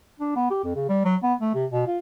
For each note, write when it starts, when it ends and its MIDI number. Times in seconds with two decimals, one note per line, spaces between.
0.20 0.32 62
0.36 0.50 59
0.51 0.59 67
0.63 0.72 41
0.75 0.85 49
0.89 1.04 55
1.05 1.16 54
1.23 1.34 59
1.41 1.52 57
1.54 1.66 48
1.70 1.87 47
1.87 1.98 65